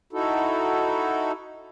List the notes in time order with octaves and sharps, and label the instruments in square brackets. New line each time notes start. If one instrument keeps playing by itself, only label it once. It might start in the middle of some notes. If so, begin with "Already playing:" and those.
[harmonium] D#4 E4 F#4 A4